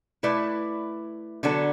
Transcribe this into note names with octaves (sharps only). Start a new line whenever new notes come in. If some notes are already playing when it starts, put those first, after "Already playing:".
A3 E4 B4 D5
D3 F#3 B3 D4 A4